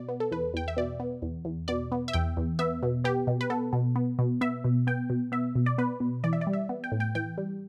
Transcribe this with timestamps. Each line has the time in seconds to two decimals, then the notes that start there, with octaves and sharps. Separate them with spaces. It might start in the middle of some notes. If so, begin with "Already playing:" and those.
Already playing: B2 D5
0.09 B3
0.20 A4
0.32 E2 B4
0.54 E2 G5
0.68 E5
0.77 B2 D5
1.00 B3
1.22 E2
1.45 E2
1.68 B2 D5
1.92 B3
2.08 E5
2.13 E2 G5
2.37 E2
2.59 B3 E5
2.83 B2
3.04 B3 G4
3.27 B2
3.41 B4
3.50 B3 A4
3.73 B2
3.95 B3
4.19 B2
4.41 B3 E5
4.64 B2
4.87 B3 G5
5.10 B2
5.32 B3 E5
5.55 B2
5.66 D5
5.78 B3 B4
6.00 B2
6.24 E3 D5
6.33 E5
6.41 D5
6.47 G3
6.53 E5
6.69 B3
6.84 G5
6.92 A2
7.00 G5
7.15 E3 G5
7.38 G3